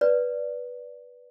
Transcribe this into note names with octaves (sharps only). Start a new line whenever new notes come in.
B4 D5